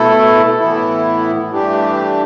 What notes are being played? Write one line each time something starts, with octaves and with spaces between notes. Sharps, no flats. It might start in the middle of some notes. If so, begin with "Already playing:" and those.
Already playing: B2 A3 E4 A4
A2 E3 B3 E4
G2 E3 A3 D4 G4